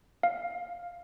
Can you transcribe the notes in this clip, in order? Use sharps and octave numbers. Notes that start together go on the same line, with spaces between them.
F5